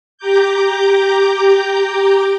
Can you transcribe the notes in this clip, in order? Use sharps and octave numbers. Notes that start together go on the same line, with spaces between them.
G4 A#5 D6 G6